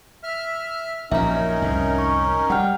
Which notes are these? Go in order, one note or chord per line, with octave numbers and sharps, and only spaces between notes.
E5 F6
A#1 F#2 C#4 D#4 A#4 E5 A#5
C2 F2 G#2
C#6
G3 F#5 G5 F6